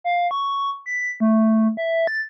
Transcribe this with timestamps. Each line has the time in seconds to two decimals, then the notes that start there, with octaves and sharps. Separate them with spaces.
0.04 F5
0.31 C#6
0.86 B6
1.20 A3
1.77 E5
2.07 A6